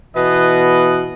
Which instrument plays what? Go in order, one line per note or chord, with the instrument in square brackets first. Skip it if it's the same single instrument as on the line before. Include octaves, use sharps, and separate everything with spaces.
[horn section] B2 E3 B3 B4 D#5